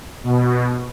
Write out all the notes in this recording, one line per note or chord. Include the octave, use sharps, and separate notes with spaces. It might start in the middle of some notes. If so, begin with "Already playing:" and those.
B2